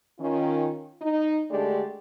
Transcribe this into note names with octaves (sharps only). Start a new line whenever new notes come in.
D#3 C#4 F4
D#4
D3 G#3 A3 D4 G4 D5